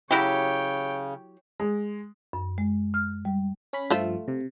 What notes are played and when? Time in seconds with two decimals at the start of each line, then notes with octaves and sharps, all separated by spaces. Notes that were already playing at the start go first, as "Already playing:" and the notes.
0.11 C#3 F#3 E4 G4 C#5 G5
1.60 G#3
2.33 F#2
2.58 G#3
2.94 F6
3.25 G3
3.73 C#4 B5
3.90 G2 F3 A3 F4 E5
4.28 C3